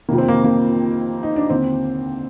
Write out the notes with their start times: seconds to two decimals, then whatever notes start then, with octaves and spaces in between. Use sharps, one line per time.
0.09 F2 C3 D#3 A#3
0.18 C4
0.28 A#3
0.44 A#3
1.23 D#4
1.36 D4
1.50 D#2 D3 C4